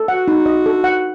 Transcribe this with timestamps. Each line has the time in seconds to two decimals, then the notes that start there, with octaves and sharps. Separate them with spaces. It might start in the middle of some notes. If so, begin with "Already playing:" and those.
Already playing: A4
0.08 F#4 F#5
0.28 D#4
0.46 D#5
0.66 A4
0.84 F#5